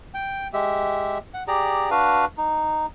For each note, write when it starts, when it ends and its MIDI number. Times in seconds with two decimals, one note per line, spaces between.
0.14 0.48 79
0.53 1.18 56
0.53 1.18 67
0.53 1.18 76
1.34 1.43 78
1.48 1.90 67
1.48 1.90 68
1.48 1.90 74
1.48 1.90 82
1.91 2.25 62
1.91 2.25 66
1.91 2.25 71
1.91 2.25 77
2.38 2.86 63